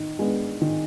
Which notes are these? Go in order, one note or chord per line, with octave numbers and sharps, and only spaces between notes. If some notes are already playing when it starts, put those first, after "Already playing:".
Already playing: D#3
G#3 B3 D4
D#3